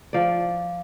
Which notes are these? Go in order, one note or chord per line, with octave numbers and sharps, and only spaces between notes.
F3 D5